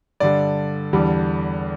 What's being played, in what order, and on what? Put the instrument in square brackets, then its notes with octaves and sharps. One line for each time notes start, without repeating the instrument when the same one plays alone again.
[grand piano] G2 D3 G3 D5
E2 D3 G3